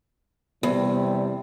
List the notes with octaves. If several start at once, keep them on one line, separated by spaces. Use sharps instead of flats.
E2 C3 G3